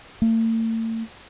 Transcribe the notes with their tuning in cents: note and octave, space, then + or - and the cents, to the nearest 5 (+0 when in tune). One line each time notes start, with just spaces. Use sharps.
A3 +45